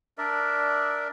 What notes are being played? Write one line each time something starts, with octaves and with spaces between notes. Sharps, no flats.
D4 A#4 D5 E5